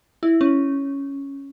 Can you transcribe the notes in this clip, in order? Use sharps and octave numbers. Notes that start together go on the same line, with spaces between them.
E4
C#4